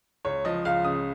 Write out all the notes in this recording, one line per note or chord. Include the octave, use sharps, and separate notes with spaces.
C#2 C#5
F3 D#5
C#2 F5
C#3 D#6